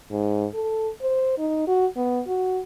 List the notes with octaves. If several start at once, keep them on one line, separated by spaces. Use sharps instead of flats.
G#2
A4
C5
D#4
F#4
B3
F#4